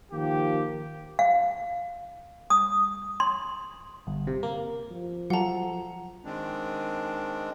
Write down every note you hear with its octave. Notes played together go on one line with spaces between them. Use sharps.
D#3 F3 A#3 G4
F5
D#6
C6
G1
C3
A#3
F3
F#3 F4 A4 F#5 A#5
D#3 G#3 C4 D4